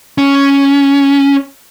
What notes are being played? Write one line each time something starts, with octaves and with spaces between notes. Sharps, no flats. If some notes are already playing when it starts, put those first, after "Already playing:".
C#4